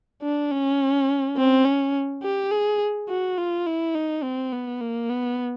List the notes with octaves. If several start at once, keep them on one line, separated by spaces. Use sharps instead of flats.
D4
C#4
C4
C#4
G4
G#4
F#4
F4
E4
D#4
C4
B3
A#3
B3